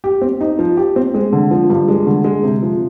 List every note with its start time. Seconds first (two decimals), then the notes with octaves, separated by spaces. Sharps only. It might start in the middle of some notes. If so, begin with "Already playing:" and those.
0.04 G4
0.21 C4
0.41 D#4
0.59 F3
0.77 G4
0.96 C4
1.14 G#3
1.33 D3
1.51 F3
1.70 G2
1.88 G#3
2.07 D3
2.24 G#3
2.43 C3
2.62 F3